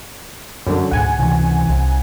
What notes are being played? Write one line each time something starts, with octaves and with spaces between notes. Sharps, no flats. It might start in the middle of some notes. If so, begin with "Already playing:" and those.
F#2 D3
D2 G#2 F#5 G#5
C#2 C3 E3
C2